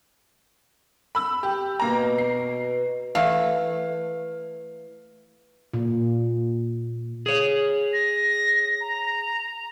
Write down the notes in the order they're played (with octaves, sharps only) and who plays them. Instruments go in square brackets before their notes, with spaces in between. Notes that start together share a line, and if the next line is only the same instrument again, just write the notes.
[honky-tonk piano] B5 E6
G4
[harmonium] B2 [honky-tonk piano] A#3 A#5
[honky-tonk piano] C7
[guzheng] E3 A3 [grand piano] F5
[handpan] A#2
[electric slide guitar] G#4 C#5
[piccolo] A#6
A#5